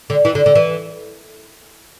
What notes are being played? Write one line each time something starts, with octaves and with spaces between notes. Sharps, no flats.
D3
E3
D3
D3
E3